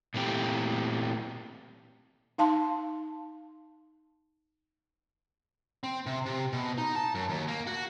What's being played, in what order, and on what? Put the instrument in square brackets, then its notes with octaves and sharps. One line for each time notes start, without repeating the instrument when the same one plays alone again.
[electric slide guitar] A#2 E3 A3 C4 G4
[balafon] D#4 F5 A5 C6
[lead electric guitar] C4
C3
C3
B2
D#4
A5
F#2
D#2
A#3
F#4